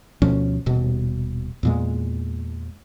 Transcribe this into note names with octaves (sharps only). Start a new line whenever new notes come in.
D2 B2 F3 C#4
D#1 B2
E2 A#2 G#3